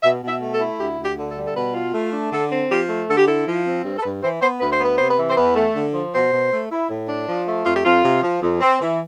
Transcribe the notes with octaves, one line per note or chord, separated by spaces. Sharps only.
B2 E5
B2
E5
A3
A4
E4
D2 G4
D2
G4
D3
A4
G3
A4
B2 B4
F4
A3
D4
D3 A4
C4
F3 G4
A3
D3 A4
G4
E4 A4
F3
C4
G2
A4
G2 B4
E3 C5
B3 C5
D2 B4
C5
B3 B4
C3 C5
B4
E3
C5
E2 B4
A3
D3
F3
B2 C5
B2
A3
E4
A2
D4
F3
A3
F2 F4
G4
F2 F4
C3
F3
F2
C4
E3